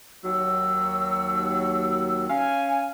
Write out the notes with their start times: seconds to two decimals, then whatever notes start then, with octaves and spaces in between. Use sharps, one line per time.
0.24 D#2 F#3 E6
2.29 C#4 F5 G#5